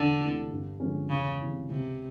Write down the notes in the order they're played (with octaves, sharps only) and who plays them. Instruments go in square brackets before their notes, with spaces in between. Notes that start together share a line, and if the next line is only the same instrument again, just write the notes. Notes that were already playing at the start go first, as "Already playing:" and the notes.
Already playing: [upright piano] E1 [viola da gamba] D3
[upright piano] D2 C3 E3 A3
G2
D3 F3 G#3 C#4
[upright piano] E1 [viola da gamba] C#3
[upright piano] E2 C3
[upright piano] C#2 [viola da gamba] C3